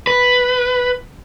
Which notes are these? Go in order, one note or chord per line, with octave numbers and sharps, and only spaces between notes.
B4